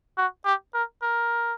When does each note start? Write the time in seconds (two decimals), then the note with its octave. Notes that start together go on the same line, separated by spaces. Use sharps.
0.18 F#4
0.45 G4
0.74 A#4
1.02 A#4